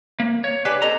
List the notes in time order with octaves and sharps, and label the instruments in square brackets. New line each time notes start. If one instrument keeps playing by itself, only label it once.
[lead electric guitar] A#3
C#5
[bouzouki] D4 G4 G#5 [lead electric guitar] B4
[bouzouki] C4 D#4 A4 [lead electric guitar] A#5